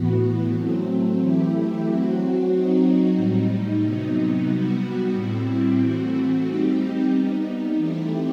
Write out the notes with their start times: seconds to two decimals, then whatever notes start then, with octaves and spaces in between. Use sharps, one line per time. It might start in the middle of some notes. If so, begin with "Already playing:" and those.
Already playing: A2 E3 B3 F#4
0.53 F#3 A3 C4
1.19 E3 A3 E4 G4
1.84 F#3 C4 F#4
2.50 F#3 C4 D#4 F#4
3.16 A2 G3 D#4
3.81 C3 F#3 B3 D#4
4.47 G3 B3 F#4
5.13 A2 G3 C4 E4
5.79 E3 A3 C4 F#4
6.45 G3 C4 D#4 G4
7.10 G3 B3 D#4
7.76 E3 A3 C4 E4 G4